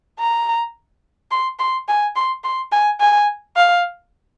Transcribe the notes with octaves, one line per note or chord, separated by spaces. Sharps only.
A#5
C6
C6
G#5
C6
C6
G#5
G#5
F5